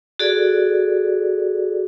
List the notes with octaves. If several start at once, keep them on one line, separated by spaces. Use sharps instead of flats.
F#4 G#4 A4 D5